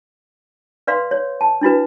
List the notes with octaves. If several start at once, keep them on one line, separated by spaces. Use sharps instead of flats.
B4 D5 F5 C6
C#5 D5
A5
D4 E4 F#4 B4